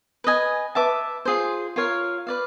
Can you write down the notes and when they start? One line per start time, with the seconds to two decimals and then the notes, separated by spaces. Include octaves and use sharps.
0.24 B4 D#5 G#5
0.75 B4 E5 A5 D6
1.25 F4 G#4 C5
1.76 F4 A#4 C#5 F5
2.27 B4 D5 F5